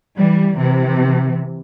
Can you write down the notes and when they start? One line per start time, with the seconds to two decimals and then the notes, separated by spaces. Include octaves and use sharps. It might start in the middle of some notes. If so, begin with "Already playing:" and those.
0.16 E3 G3
0.58 C3 E3